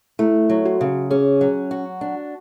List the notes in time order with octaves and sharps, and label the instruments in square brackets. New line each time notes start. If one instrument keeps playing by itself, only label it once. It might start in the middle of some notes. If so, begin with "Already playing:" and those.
[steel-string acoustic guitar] A3 [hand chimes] E4
[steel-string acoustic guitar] F#3
[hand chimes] F#4
[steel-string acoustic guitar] C#3
[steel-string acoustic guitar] C#4 [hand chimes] G#4
[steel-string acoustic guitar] F#3
F#4
D4